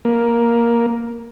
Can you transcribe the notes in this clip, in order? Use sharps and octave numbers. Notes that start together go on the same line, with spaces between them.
A#3